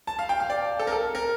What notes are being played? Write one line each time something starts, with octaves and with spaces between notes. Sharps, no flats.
A5
F5
G5
F5
D5
A4
A#4
A4
A#4